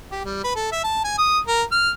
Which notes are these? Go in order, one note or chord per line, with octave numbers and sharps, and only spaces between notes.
G4
G3
B4
A4
E5
A5
G#5
D#6
A#4
F6